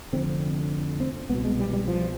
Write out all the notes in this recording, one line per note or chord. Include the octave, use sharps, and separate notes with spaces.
F1 F2 D3 C4
C4
C2 B3
B2
G#3
G3
G3
F3